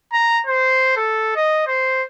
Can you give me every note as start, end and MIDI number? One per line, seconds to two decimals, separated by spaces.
0.13 0.40 82
0.47 0.92 72
0.97 1.35 69
1.36 1.63 75
1.67 2.03 72